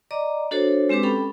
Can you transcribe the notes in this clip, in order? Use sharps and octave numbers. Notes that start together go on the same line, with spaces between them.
D5 D#5 A#5 D6
D4 F#4 A4 C5 C#5
G#3 C4 G4 B4 D6
C#4 A4 G5 B5